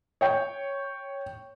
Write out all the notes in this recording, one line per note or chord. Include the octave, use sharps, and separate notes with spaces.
C#5 G5